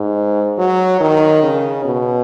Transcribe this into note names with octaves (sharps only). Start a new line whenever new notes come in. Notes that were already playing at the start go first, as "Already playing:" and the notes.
Already playing: G#2
F#3
D#3
C#3
B2